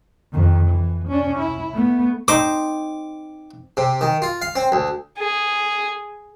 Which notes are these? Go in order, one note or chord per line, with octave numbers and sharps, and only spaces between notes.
F2 D#3
E3
C#4 D4
E4
A3 B3
C4 D#4 C5 D6
C3
D#3
F4
F5
C4
D2
G#4